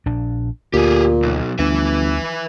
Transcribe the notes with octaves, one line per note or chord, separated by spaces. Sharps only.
A#1 D4
D2 A#2 G4 G#4
B1
G1 D2 B4 E5